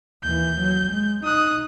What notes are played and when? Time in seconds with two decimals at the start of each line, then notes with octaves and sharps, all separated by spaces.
0.23 D#2 E3 G6
0.60 F#3
0.92 G#3
1.25 D#4 D#6 F#6